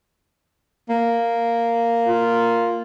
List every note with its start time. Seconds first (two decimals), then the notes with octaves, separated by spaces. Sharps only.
0.89 A#3
2.08 F4